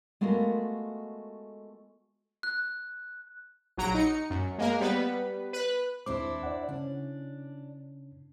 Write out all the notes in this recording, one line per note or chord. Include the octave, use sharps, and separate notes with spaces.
G#3 A3 B3 F4 F#4 A#4
F#6
A#1 F#3 A#5 D7
D#4 C#7
F#2
G#3 A#3 A#4
G3 B3 B4
B4 F#6
D#2 C4 D4 E4 D6
D5 F#5
C#3 C#4 D4